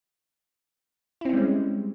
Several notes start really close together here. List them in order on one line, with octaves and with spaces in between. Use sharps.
E4 C4 C#4 G3 G#3